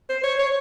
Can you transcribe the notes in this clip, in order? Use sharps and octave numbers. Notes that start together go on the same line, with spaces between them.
C5
C#5
C#5